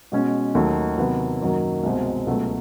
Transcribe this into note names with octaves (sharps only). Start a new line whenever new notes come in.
B2 G#3 C#4
D#2 D#3 F#3 A3
C3 D#3 F#3 B3
F#2 D#3 F#3 A#3
C2 B2 G#3 C4
C#2 B2 F#3 A3